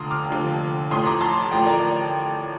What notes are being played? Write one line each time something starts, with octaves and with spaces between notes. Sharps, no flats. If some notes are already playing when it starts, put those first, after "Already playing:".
Already playing: F1 D#2 D3 F3 A#5 C6 D6 D#6
D6 F6
F1 D#2 D3 F3
A1 A2 F3 C6 D#6
A#5 D6
A5 C6
A1 A2 F3 G5 A#5
A#4 D5